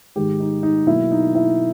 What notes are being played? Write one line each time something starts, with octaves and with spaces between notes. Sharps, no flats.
G#2 D#3 G#3 G4
D#4
D#4
B2 F#3 A#3 E4
D#4
E4